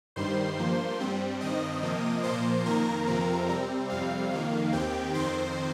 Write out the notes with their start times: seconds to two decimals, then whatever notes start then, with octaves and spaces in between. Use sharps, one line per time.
0.16 G2 D#3 G3 C5 C6
0.57 G2 F3 A#3
1.00 G2 G3 C4
1.41 G2 D#3 C4 D#5 D#6
1.82 C3 F3 A#3
2.23 A#2 F3 A#3 C5 C6
2.66 F2 D#3 A#3 A#4 A#5
3.07 F2 C3 F3 C4
3.49 C3 G3 C4
3.89 F2 C3 G3 C4 F5
4.31 F2 D#3 A#3 F5
4.73 D#2 D#3 C4 G4 G5
5.14 F2 D#3 C4 C5 C6